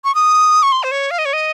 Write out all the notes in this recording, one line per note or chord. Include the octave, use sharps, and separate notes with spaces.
C#6
D#6
C#6
C6
C5
C#5
F5
D#5
C#5
D#5